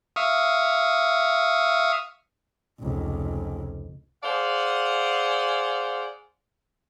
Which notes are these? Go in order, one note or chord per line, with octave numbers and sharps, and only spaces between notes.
E5 F5 C#6 D#6
F1 C#2
G#4 C5 D5 F5 F#5